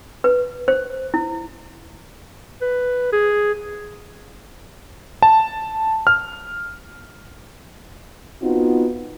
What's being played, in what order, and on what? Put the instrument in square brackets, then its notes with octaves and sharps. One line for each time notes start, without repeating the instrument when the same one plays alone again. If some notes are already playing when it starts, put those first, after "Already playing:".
[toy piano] B4
C5
E4
[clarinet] B4
G#4
[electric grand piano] A5
F6
[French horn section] B3 C4 D#4 F4 F#4